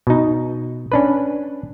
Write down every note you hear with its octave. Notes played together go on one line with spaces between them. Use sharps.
B2 D#4
C#4 D4 B4